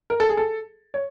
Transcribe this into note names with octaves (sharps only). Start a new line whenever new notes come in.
A#4
A4
G#4
A4
C#5